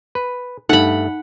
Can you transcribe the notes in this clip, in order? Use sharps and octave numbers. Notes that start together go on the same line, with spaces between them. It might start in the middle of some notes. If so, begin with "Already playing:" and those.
B4
G2 A3 D#4 F#5 B5